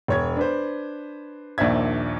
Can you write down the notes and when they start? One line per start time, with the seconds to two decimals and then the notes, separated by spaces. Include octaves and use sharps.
0.08 E1 C#5 G#6
0.37 D4 B4 C5
1.58 A#1 D#2 D4 C5 E5 G#6